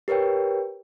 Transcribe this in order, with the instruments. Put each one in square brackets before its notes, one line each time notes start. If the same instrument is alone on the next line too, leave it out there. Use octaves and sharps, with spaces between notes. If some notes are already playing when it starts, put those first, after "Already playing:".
[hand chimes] G4 A#4 B4 C#5 G5